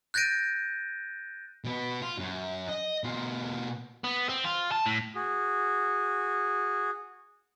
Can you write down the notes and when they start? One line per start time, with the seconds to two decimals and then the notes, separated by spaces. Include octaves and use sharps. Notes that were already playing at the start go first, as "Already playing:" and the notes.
0.14 F#6 G6 A6 A#6 D7 D#7
1.65 B2 B3
2.02 F4
2.18 F#2
2.69 D#5
3.04 B2 F4
4.04 B3
4.29 C4
4.45 F4
4.72 A5
4.86 A2
5.15 F#4 G#4